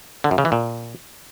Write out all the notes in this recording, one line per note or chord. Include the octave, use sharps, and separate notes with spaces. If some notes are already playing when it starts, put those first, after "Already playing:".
D3
F#2
C#3
E3
A#2